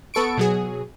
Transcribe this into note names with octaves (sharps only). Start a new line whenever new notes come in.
B3 A4 C#6 D7
B2 F#3 G#4